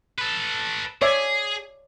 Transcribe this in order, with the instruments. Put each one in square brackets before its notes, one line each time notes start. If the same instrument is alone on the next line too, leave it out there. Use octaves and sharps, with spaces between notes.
[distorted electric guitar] A4 B4
[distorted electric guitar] G#4 [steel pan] C#5 D5 E5